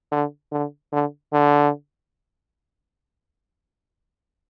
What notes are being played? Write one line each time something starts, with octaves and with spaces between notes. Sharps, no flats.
D3
D3
D3
D3